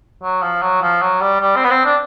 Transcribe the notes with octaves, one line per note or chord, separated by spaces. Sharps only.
F#3
F3
F#3
F3
F#3
G3
G3
C4
B3
C4
D4